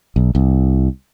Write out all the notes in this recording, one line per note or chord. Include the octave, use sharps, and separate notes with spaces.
B1
C2